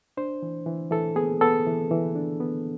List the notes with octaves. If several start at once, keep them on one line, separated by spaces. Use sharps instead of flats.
D4 C5
E3
E3
E3 A4
B3 G#4
B3 A4
E3
E3
D4
B3